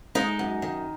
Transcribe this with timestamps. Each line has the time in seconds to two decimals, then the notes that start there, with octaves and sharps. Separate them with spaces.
0.15 G#3 D#4
0.39 F#2
0.62 D#3